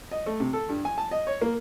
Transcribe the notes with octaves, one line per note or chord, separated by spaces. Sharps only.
D#5
A3
C3
A4
G2
G#5
A5
D#5
C#5
A#3